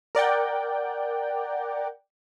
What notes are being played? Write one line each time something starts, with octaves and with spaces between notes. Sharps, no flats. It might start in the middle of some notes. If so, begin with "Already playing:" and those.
A#4 D5 F#5 G5